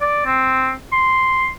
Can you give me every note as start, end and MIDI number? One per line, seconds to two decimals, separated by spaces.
0.01 0.22 74
0.26 0.71 60
0.92 1.48 84